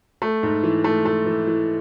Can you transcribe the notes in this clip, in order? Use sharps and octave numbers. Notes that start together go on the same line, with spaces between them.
A3
G#2
E3
A3
A3
E3
E3